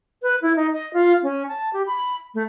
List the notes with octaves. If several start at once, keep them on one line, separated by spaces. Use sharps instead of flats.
B4
E4
D#4
D#5
F4
C#4
A5
G4
B5
A3